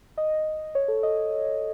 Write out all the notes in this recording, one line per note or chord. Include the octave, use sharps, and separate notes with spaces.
D#5
C#5
A4
D#5